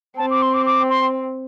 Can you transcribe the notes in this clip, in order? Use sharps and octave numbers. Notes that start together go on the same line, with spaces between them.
C4 A5
D6
C6
D6
D6
C6